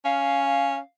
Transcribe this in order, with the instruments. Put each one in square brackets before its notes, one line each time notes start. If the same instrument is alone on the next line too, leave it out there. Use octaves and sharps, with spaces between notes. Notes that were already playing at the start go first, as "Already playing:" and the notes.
[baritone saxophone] C#4 [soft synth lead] F5